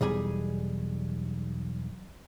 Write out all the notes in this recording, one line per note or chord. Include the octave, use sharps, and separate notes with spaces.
B1 E2 G3 G#4